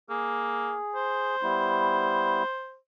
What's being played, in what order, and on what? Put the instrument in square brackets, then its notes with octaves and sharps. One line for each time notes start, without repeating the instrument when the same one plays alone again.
[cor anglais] A#3 [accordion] G#4
[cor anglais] C5
[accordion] G3 B3 E4